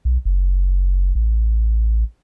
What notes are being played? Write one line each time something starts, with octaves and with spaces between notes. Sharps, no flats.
B1
F#1
A1